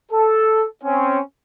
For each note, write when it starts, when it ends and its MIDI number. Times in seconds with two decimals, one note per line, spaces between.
0.12 0.65 69
0.83 1.20 60
0.83 1.20 61